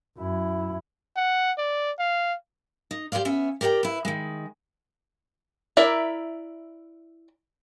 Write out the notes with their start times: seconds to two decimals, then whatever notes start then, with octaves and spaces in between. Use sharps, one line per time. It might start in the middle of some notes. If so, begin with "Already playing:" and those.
0.18 F#2 E4
1.16 F#5
1.58 D5
1.99 F5
2.91 D#4
3.12 G4 B4 C5 D5 F5
3.25 B3 C#4 E5
3.61 G4 A#4 D5 F#5 G5
3.83 E4 B4
4.05 D#3 G#3
5.77 E4 A#4 D5 E5